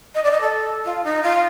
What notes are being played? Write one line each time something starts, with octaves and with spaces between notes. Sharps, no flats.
D#5
D5
D#5
A4
F4
D#4
F4